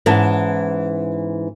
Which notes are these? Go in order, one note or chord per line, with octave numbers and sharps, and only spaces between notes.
G#2 E3 B3 C#4 A5